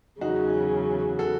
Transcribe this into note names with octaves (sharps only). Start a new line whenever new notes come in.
E2 C#3 F#3 D#4 F#4
F#4 A4